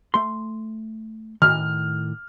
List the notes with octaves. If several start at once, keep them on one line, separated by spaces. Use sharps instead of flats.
A3 C6
A2 D#3 F6